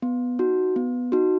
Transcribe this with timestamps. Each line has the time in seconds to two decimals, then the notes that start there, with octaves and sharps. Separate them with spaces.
0.02 B3
0.39 D#4 F#4
0.76 B3
1.12 D#4 F#4